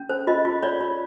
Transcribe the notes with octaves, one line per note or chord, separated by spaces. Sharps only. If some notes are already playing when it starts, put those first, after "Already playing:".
Already playing: C#4
C5
F4 D#5
F4
C#5 D5
F4